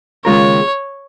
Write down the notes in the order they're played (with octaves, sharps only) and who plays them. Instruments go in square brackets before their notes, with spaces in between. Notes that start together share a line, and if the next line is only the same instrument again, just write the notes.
[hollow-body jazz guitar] D#2 C#3 G#3 F4 A#4 [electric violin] C#5